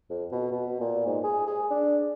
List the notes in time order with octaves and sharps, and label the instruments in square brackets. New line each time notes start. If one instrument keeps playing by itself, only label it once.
[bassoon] F2
B2
B2
A#2
G#2
G#4
G#4
D4